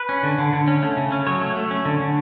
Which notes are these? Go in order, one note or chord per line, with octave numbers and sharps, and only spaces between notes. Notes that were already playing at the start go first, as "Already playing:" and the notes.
Already playing: B4
C#4
D3
D3
D3
C#4
A3
C#3
C#4
F#3 C#5
A3
A3
C#4
D3
D3